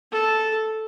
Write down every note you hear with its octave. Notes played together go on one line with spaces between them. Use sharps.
A4